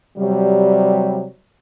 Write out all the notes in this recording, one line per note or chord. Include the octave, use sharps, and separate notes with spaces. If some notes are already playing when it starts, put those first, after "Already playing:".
C3 F#3 G3